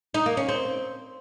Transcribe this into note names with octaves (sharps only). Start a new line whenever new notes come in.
D#4
A#3
C#4
C4